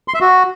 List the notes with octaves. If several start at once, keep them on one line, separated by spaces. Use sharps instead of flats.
C6
E5
F#4